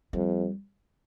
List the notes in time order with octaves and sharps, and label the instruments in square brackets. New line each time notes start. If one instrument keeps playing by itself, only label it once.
[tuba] F2 [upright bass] G3